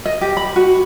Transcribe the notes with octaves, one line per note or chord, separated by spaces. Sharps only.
D#5
G4
B5
F#4